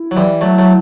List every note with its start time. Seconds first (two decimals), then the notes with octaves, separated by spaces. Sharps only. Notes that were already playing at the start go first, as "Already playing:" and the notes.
Already playing: E4
0.11 F#3
0.17 E3 G3
0.41 F#3 A3
0.58 F#3 A3